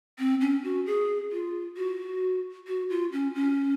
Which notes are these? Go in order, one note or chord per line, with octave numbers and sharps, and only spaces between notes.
C4
C#4
F#4
G#4
F4
F#4
F#4
F4
C#4
C#4